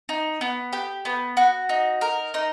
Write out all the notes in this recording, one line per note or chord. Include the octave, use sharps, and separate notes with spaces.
D#4
B3
G4
B3
F#4
D#4
A#4
D#4